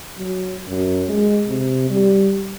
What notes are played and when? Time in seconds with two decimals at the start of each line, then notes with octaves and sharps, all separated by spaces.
0.18 F#3
0.68 F#2
1.09 G#3
1.48 C3
1.90 G3